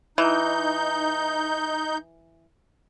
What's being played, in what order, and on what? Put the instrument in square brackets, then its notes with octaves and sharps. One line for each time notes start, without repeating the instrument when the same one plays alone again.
[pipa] E3 [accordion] D#4 G6